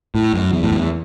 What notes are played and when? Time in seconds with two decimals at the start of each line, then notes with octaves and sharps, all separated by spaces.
0.15 A2
0.34 F#2
0.52 E2
0.64 A2
0.72 F#2
0.76 E2